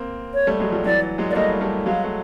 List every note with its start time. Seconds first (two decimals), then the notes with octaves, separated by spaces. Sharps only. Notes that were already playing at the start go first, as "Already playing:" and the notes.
Already playing: A#3 C4
0.34 C#5
0.47 G3 A3
0.60 F#3 G#3
0.72 F3 G3
0.85 E3 F#3 D5
1.18 F#3 G#3
1.30 A#3 D5
1.36 G3 A3 D#5
1.61 G3 A3
1.86 F#3 G#3 F5
2.04 A3